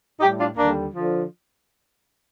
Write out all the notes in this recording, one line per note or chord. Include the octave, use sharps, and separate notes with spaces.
A2 G3 D#4 G4
D4 F4
D#2 D3 G3 A#3 D4
D3 F3